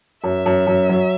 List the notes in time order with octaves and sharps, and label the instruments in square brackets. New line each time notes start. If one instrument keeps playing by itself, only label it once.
[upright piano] F#2 [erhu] E5
[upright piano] F#2
F#2
F#3